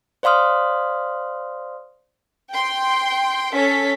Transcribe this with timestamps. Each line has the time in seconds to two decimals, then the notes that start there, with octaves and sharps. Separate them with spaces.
0.23 C5 D5 F5 C6 D#6 F6
2.53 G5 C6
3.54 C#4 A4 B6